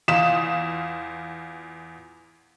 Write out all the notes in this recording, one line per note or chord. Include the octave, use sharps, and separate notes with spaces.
E2 F4 F5 D#6 B6 E7